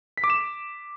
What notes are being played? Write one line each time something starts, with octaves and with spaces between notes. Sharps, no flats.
B6
D6
E7